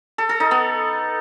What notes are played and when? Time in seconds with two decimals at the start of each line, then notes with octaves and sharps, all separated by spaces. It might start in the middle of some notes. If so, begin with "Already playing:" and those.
0.18 A4
0.29 A4
0.40 D#4
0.51 B3